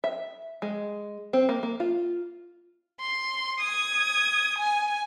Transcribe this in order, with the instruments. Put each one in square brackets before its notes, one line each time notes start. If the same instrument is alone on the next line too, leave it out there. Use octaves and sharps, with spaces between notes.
[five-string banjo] E5
G#3
C4
A#3
A#3
F4
[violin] C6
D#6 G#6
G#5